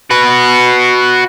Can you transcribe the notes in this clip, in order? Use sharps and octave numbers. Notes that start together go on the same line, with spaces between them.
F#4 B4